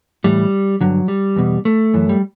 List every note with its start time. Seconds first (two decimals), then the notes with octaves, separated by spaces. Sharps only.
0.24 A2 E3 G3
0.81 G2 D3 F#3
1.08 G3
1.36 E2 B2
1.65 A3
1.94 F#2 E3
2.09 G3